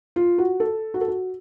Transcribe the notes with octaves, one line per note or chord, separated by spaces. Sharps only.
F4
F#4
A4
F#4
A4
F#4